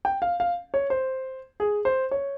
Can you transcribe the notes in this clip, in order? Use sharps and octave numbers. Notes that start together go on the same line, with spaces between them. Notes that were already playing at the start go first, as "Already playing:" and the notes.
G5
F5
F5
C#5
C5
G#4
C5
C#5